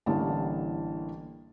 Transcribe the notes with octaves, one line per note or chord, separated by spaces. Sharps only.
A1 D3 E3 G3 A#3 A5